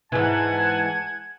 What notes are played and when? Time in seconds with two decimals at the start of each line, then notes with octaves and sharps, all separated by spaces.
0.12 G#2 E3 F#5 G#5 A5 G#6